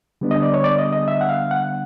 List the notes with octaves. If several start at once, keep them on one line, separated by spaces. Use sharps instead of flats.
D3 G3 B3 D4
D#5
D5
C#5
D5
D#5
D#5
E5
F#5
F5
F#5